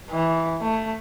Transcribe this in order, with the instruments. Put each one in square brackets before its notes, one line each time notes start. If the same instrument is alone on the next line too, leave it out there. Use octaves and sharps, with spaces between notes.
[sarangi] E3
A3